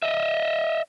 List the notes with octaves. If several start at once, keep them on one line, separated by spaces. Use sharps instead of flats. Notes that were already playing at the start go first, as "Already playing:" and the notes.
D#5 E5